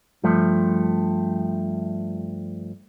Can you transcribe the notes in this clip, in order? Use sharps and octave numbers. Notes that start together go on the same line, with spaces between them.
G2 F3 A3